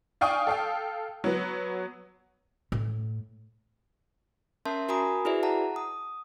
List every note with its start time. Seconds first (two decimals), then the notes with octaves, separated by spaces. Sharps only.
0.21 D5 F5 G5 G#5 C#6 D#6
0.47 A4 F5 G5
1.24 F#3 B3
2.72 A2
4.65 C#4 A#4 E5 A5 C6 G6
4.89 F#4 A#4 G#5 A#5 B5 D#6
5.25 E4 F#4 G#4 B4 D5 E5
5.43 F#5 A5 A#5
5.76 D#6